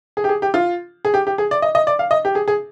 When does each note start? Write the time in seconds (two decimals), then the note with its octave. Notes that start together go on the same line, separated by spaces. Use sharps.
0.17 G#4
0.24 G4
0.29 G#4
0.42 G4
0.54 F4
1.05 G#4
1.14 G4
1.27 G4
1.38 G#4
1.51 D5
1.62 D#5
1.75 D#5
1.87 D5
1.99 F5
2.11 D#5
2.25 G4
2.35 G#4
2.48 G#4